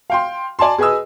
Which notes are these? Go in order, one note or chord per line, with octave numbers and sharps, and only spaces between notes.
F5 G5 C6
D5 G#5 A5 C6
G#4 B4 D#5 G#5 D#6 E6